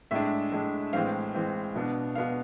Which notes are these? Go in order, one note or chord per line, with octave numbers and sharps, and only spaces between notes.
A2 G#3 D4 E5
A2 G#3 D4
A2 E3 G#3 C4 F5
A2 E3 G#3 C4
B2 B3 D4
B2 B3 D4 F5